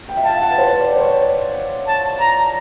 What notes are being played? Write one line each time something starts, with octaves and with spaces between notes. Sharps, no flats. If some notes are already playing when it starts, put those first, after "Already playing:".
G5
E5
F5 A5
F#5
B4
C5
D5
C5
C#5
A5
A#5